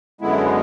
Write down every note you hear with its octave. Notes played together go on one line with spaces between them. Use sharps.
F#2 D3 G#3 B3 E4